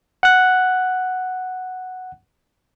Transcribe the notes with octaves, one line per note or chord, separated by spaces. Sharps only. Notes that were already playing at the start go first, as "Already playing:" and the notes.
F#5 F#6